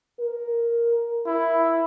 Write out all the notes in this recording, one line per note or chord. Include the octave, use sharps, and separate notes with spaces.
A#4
E4